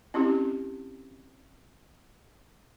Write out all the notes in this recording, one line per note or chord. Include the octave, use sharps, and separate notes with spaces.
C4 C#4 E4 G4